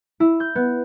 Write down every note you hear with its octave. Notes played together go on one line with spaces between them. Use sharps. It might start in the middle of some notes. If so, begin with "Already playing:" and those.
E4
G6
B3